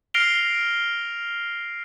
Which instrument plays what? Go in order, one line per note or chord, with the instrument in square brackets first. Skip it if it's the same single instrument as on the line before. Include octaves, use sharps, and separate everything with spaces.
[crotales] F6 A#6 C7 D7 F7 G7